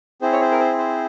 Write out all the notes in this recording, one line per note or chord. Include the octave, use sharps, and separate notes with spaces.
C4 E4 G#4 C5
C#5
C5
A#4
C5
C5